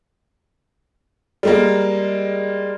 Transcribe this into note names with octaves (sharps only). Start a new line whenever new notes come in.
G3 G#3 A#3